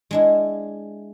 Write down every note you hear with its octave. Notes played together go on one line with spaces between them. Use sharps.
G#3 D4 E4